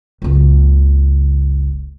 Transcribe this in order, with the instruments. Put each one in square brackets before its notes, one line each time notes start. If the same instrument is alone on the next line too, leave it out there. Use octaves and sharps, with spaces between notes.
[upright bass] F#1 C#2